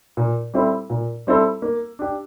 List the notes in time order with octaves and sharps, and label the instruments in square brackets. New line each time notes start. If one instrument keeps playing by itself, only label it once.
[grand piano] A#2
G3 C4 E4 A4
A#2
G3 C4 E4 A4
A#3
D4 G4